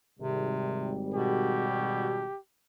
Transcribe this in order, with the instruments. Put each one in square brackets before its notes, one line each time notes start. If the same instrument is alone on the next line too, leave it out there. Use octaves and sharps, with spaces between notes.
[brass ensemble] G#1 G3 [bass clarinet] C3
[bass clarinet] B2 [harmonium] F#4 [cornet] G4